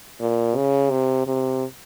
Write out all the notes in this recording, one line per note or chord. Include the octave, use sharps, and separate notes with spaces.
A#2
C#3
C3
C3